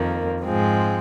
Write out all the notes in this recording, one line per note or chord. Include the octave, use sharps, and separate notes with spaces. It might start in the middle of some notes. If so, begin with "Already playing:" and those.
Already playing: F2 D#3 A#3
G#2 F3 G#3 C4